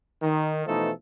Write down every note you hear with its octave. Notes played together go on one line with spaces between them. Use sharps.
D#3
B2 E3 F3 A3 D#4 A4